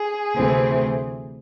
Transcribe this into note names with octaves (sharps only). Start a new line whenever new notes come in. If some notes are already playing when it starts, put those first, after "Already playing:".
Already playing: G#4
D2 C3 E3 A3 C4